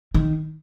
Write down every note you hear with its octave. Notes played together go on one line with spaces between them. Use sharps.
D#3